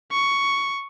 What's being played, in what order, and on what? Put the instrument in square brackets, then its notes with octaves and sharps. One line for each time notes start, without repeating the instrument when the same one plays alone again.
[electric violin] C#6